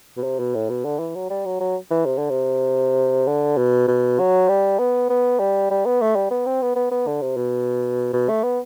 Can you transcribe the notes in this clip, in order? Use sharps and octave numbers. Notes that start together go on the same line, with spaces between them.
B2
C3
B2
A2
B2
D3
E3
F#3
G3
F#3
F#3
E3
C3
D3
C3
D3
B2
B2
F#3
G3
B3
B3
G3
G3
B3
A3
G3
B3
C4
B3
B3
B3
D3
C3
B2
B2
A3
B3